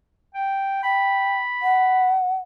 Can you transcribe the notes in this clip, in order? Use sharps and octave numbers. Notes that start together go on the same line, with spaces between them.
G5
G5 B5
F#5